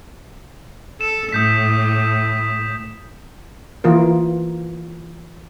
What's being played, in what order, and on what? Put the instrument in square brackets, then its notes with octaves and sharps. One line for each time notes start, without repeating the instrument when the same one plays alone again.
[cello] A4 [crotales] E7
[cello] A2 [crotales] D#6 G6 B6
[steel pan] E3 A#3 F4 A#4